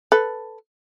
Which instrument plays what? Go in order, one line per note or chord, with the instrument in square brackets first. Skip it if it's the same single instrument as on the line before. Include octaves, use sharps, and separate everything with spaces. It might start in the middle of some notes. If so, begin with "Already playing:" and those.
[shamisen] A4 B4